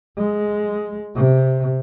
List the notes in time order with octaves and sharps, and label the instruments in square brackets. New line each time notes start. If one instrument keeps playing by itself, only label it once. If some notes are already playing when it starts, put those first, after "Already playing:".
[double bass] G#3
C3